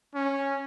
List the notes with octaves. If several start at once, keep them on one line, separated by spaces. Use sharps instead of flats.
C#4